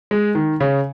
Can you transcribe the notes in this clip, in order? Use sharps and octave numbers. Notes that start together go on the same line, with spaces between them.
G#3
D#3
C#3